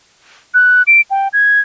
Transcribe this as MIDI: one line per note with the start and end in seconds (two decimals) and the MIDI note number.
0.54 0.83 90
0.87 1.01 98
1.11 1.28 79
1.33 1.60 92